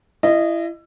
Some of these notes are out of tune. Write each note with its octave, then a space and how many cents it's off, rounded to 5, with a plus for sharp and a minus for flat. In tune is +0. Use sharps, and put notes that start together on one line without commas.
E4 +25 D#5 -15